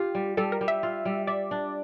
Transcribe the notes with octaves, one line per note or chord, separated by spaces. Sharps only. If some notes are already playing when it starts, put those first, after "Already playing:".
Already playing: F4 G4
G3
G3 A4
A#4
G3
E5
F4
G3
D5 E5
D4